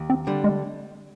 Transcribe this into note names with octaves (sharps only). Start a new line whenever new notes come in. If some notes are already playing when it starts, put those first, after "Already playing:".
Already playing: D#2
C4
D3 G3
G#3